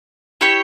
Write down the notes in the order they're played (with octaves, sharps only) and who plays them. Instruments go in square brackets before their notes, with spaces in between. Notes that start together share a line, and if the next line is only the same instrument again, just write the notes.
[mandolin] E4 G4 C#5 G5